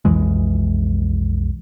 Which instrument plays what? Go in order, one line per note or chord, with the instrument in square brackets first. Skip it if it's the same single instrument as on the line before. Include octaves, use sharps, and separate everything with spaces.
[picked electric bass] B1 F2 E3 G#3